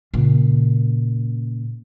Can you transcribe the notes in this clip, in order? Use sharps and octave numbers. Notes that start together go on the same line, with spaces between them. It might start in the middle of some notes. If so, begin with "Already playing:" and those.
A#2 C#3